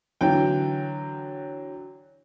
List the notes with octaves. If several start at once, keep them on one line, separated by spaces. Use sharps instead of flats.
D3 E3 F#3 G5